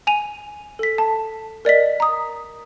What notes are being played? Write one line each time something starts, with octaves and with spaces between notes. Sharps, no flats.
G#5 D#7 F7
A4 B6
A5
A#4 D5 D#5 B6
A#5 D#6